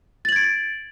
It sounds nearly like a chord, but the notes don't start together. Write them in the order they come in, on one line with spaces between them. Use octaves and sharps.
A6 F#7 G#6 D7